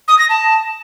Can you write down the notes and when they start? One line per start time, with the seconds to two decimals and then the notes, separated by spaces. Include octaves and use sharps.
0.08 D#6
0.19 A#6
0.29 A5